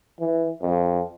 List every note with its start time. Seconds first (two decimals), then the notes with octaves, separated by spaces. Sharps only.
0.20 E3
0.62 F2